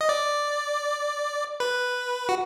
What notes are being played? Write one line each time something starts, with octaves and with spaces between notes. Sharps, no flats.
D#5
D5
B4
F#4